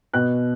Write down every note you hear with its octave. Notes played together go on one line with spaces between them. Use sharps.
B2 F#6